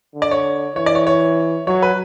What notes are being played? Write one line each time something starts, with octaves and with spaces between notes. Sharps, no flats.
D3
D5
C#5
E3 C#5
D5
C#5
C#5
F#3 C#5
B4